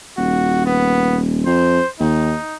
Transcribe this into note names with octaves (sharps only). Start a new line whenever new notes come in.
D#1 F#4
B3
F2 C5
D#2 D#4